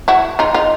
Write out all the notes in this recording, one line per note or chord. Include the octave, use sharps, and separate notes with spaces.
E4 F#4
D#4 F4
D#4 F4